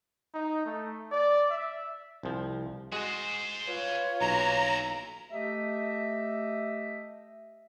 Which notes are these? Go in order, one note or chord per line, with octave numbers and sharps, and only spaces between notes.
D#4
A3
D5
E5
C2 F3
G#3 F#4 G#4 C5
F4 B4 C#5
B1 A#2 E4 A#5
A3 G4 D#5 E5